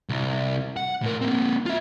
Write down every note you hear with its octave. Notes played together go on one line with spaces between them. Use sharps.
C2
F#5
A2 A#4
A#3 C4
F4 E5